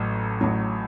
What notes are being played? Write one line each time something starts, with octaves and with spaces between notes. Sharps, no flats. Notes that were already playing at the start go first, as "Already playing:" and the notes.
Already playing: A1 A2 F#3
A1 A2 F#3